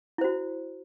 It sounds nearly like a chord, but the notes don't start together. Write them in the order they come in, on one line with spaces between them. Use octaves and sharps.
E4 C5 F#4